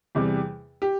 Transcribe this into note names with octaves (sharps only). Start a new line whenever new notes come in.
E2 C3 G3
G4